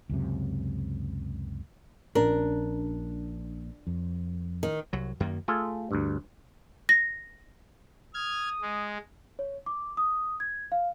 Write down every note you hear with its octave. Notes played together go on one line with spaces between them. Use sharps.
C#2 F#2 C3
A#1 A#2 C#4 D4 A#4
F2
D#3
C2 F#3
F#2 D#3 A#3
A3 F4 G#4 A4
D2 G2
A#6
D#6 F6 G#6
G#3
C#5
D6
D#6
G#6
F5